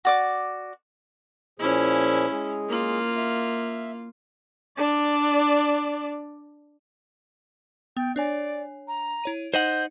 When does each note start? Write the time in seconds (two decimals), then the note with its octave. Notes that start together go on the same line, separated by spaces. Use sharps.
0.05 F#4 D5 D6
1.59 A#2 F3 C#4 E4 G#4
2.31 G#3 G#4
2.69 A#3 F4
3.17 E5
4.77 D4 D5
7.97 B3 G5
8.16 D4 C#5 D5 G#5
8.88 A#5
9.24 E4 C#5 D#7
9.54 D#4 C5 D#5 F#5 G6